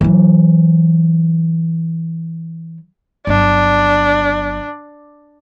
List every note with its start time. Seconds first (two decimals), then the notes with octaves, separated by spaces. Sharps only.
0.01 E3 F#3
3.27 G1 F#3 D4